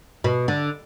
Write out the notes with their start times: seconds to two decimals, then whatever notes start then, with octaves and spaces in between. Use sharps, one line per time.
0.24 B2
0.48 D3